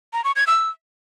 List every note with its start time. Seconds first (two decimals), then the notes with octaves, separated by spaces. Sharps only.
0.13 A#5
0.24 C#6
0.36 G#6
0.47 E6